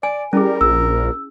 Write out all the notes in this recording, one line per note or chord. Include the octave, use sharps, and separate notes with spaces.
D5 G#5
G3 C#4 E4 G#4 A#4
A#1 E6